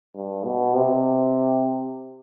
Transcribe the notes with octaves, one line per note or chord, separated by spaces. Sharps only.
G2
B2
C3